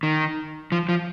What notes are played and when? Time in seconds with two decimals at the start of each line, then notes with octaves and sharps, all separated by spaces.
0.03 D#3
0.72 F3
0.89 F3